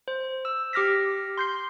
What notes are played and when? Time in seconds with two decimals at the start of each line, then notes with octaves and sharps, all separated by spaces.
0.08 C5
0.45 E6
0.73 G4 D6 F6 A#6 B6
1.38 C6 G6 C7